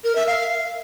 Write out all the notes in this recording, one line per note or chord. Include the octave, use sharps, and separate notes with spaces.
A#4
E5
F5